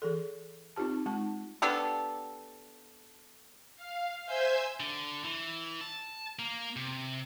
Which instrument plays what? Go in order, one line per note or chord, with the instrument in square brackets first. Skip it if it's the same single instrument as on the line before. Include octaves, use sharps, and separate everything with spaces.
[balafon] E3 G#4 A4
C4 D#4 F4 G4 A5
G#3 D#4 A5
[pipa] B3 D4 G4 A4
[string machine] F5
C5 E5 G#5 E6 G6
[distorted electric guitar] D3
E3
A5
A#3
C3